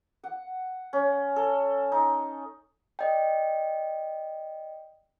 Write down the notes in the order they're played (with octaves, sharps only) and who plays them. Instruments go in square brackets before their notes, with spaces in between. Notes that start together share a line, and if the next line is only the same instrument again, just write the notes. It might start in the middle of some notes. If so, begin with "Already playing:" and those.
[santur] F#5
C#4
A4
D#4
[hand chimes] D5 D#5 G5